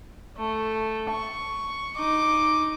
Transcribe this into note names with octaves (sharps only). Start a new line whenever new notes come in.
A3
C#6
D#4 D6